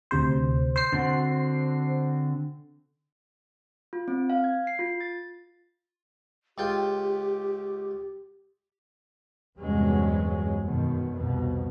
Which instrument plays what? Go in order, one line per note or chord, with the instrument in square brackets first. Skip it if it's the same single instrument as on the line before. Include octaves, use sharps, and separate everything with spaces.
[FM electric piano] D2 C3 C5
C5 C7
[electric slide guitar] D3 C4 F#4
[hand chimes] F4
C4
F5
G#6
C7
F4
A6
[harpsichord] C#2 F4 G5 [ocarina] G4
[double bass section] E2 G2 C3 F#3 G#3 C#4
F#2 B2 D#3
C2 F2 B2